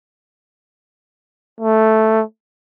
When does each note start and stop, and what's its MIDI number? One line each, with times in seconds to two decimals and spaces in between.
1.60 2.22 57